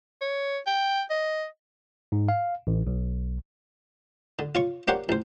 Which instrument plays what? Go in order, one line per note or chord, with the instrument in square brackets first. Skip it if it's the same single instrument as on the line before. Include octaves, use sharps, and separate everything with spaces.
[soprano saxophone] C#5
G5
D#5
[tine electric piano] G#2
F5
A1
B1
[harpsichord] D3
F4 C#5 C#6
A#3 D4 G4 C5 C#5 F#5
A1 C5